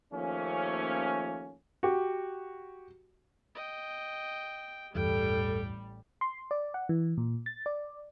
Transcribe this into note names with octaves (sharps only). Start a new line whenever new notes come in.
D#2 F3 A3 A#3 C#4
F#4 G4
D#5 G5
A1 E2 G2 G3 A4 G5
C6
D5
F#5
E3
A#2
A6
D5